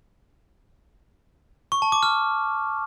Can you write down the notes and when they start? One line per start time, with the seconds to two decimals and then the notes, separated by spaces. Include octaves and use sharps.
1.72 C#6
1.82 A5
1.92 D6
2.03 F6